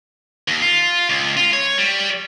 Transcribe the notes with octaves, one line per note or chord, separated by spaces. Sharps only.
D#2
F4
C#2
F4
C#5
G3